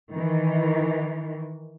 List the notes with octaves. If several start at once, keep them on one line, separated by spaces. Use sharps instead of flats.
D#3 E3